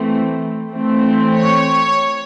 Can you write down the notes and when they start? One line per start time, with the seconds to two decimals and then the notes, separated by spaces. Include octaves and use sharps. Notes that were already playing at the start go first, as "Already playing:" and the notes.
Already playing: E3 A3 C4
0.71 E3 A3 C4
1.35 C#5